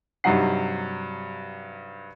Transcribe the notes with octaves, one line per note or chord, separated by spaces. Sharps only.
G2 C3 F#3 D#4 F#5 C7